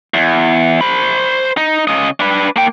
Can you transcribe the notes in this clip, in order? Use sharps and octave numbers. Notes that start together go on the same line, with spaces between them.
E2
C5 B5
D#4
C#3 D#5
D4 B4
A#3 G5